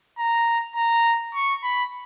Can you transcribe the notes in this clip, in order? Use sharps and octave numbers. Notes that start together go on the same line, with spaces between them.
A#5
A#5
C#6
B5